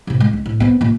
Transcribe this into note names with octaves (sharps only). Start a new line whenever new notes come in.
A2 C3
G#3
C#2
A2
B3 C4
A#2 A#3